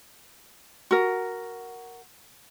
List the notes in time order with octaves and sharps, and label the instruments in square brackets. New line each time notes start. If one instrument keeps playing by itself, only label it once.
[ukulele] F#4 A#4